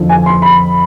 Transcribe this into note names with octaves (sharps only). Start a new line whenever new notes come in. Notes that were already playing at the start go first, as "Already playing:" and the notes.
Already playing: F2 D3 F3
G#5
C6
B5